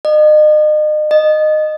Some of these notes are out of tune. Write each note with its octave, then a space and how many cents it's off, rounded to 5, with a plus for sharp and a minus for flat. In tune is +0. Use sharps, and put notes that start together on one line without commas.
D#5 -40
D#5 -15